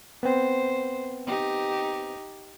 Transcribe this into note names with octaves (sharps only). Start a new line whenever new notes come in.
B3 C4 C5
D#4 G4